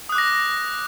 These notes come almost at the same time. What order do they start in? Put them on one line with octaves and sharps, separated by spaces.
D#6 F#6 D6 A#6